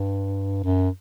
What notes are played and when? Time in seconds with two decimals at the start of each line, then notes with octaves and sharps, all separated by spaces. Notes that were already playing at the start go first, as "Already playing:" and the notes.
Already playing: G2
0.64 F#2